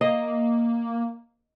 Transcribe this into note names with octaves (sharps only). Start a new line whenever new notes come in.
A#3 D#5